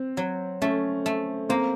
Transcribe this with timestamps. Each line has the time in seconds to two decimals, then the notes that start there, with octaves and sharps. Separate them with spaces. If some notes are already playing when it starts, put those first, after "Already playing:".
Already playing: C4
0.17 F#3
0.62 A3 C#4
1.06 A3
1.49 A#3 C4